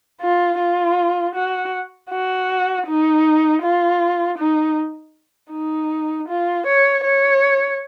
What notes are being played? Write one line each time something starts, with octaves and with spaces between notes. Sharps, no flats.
F4
F4
F#4
F#4
D#4
F4
D#4
D#4
F4
C#5
C#5